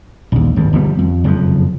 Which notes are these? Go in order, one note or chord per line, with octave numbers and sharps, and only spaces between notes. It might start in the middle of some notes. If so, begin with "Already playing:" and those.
A#1 D#2
G#1 G2
G1 F3 G3 B3
F2
F#1 F2 C3 F3